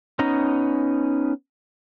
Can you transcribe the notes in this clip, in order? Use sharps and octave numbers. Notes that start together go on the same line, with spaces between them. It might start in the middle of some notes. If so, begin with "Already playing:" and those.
B3 C#4 D#4 A#5